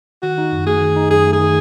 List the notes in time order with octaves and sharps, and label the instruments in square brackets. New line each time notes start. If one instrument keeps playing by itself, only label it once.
[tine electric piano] D#3 [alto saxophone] F#4
[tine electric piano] D#4
F#2
[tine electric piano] A3 [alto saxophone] G#4
[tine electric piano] D#3
D#4
[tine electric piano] F#2 [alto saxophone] G#4
[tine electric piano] A3
[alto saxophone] G#4
[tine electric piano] D#3